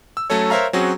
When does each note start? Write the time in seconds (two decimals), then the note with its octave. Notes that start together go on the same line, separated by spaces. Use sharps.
0.17 E6
0.30 F#3 A3 C#4 A4 C#5
0.50 A#4 C5 C#5 E5 F5 A#5
0.73 F#3 C4 C#4 F#4 G#4